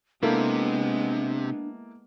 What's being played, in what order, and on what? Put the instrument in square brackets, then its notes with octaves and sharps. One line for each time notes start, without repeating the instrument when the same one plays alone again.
[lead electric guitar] C3 [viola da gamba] G#3 B3 [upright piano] A#3 E4 A4 [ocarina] D4